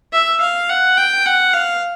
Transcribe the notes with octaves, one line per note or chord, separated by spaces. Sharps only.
E5
F5
F#5
G5
F#5
F5